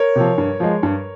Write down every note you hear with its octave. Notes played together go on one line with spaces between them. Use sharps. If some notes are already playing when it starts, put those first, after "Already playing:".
Already playing: A#4 C#5
C3 F3
G2
F3 G#3
G2